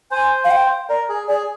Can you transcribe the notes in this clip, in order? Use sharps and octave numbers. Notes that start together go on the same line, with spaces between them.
C5 G#5
F5
G5
A#4 D5
G#4
G#4 D5